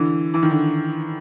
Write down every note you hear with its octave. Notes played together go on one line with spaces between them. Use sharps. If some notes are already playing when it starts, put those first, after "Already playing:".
Already playing: D3 E3
E3
D#3
D3 E3